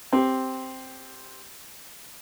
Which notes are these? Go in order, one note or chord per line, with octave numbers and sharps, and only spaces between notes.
C4 G4